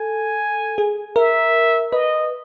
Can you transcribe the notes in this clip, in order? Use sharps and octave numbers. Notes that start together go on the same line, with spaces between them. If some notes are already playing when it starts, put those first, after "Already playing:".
Already playing: A4 G#5
G#4
A#4 E5
B4 D#5